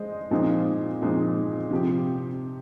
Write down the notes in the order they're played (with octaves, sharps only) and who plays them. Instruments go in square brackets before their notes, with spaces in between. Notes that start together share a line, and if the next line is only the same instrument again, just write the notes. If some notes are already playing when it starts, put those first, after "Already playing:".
Already playing: [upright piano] G#3 C5 D#5
A#2 F3 G#3 C4 D#4
A#2 F3 G#3 C4 D#4
C3 F3 C4 G4